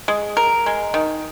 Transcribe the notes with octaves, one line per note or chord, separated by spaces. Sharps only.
G#3
A#4
G#3
D#3